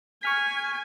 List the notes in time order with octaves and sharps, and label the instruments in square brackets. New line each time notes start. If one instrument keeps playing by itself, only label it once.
[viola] G#5 [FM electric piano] C#6 F6 B6